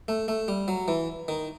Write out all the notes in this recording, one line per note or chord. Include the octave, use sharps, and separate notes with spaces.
A3
A3
G3
F#3
E3
D#3